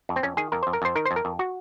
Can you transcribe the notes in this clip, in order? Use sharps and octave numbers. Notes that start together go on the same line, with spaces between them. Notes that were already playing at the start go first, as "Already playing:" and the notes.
F2
C4
F2 C#4
D#3 G#4
F2 A#4
F2 C5
A#4
F2 C5
D#3 A#4
C5
F2
A#4
F2
F#4